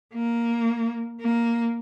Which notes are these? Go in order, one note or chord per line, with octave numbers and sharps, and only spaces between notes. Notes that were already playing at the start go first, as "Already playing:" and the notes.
A#3
A#3